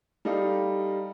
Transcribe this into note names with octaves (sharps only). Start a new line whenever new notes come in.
G3 D#4 A4 D#5 F5